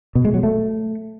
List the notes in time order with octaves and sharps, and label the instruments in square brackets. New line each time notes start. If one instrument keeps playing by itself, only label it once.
[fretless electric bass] B2
G#3
F#3
A3